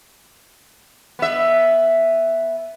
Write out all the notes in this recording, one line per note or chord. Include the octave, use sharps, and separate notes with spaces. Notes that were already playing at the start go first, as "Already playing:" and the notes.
B3 E5